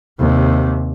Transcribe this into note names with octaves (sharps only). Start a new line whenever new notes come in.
D#2 C3